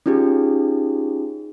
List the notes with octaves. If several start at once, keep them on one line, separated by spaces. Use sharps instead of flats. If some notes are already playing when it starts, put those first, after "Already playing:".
C#4 D#4 F4 G4 G#4